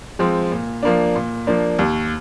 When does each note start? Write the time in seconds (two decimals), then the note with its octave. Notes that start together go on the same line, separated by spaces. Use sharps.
0.19 F3 G#3 C4
0.52 A#2
0.83 F3 A#3 D4
1.15 A#2
1.47 F3 A#3 D4
1.79 D#2